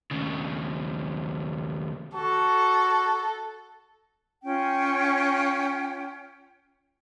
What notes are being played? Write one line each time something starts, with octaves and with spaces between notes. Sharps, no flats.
D#2 C#3
F#4 A4
C#4 F4 G5